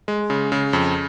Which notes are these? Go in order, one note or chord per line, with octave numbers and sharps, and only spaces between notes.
G#3
C#3
C#3
F2